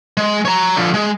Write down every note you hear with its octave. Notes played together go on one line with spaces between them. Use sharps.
G#3
C#5 A#5
D3 F3
G#3